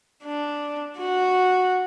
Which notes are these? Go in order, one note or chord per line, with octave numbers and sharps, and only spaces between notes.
D4
F#4